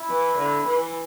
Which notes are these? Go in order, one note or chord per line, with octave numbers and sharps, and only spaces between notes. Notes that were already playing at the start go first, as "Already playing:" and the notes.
Already playing: E4
E3
D3
E3